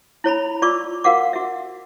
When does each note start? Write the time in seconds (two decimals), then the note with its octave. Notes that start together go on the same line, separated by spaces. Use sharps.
0.24 E4 C#5 A#5 B5
0.62 F4 D5 C#6 D6 E6
1.04 F#4 A#4 F5 F#5 D6
1.33 F#4 E5